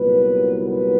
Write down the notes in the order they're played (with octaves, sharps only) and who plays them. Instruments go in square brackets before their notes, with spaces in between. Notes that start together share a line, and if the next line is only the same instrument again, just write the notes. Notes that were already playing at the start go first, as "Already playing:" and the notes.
Already playing: [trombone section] C2 A#2 F#3 B3 B4
B4